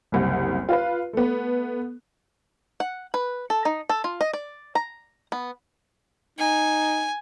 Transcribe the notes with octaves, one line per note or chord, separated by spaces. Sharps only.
F#1 C2 F#5
F4 B4
A3 B3
F#5
B4
A4
D#4
A4
F4
D#5
D5
A#5
B3
D#4 G#5